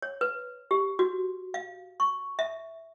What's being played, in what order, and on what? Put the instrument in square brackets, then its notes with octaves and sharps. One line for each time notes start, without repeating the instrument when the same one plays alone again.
[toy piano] C#5
B4
G4
F#4
F5
C#6
E5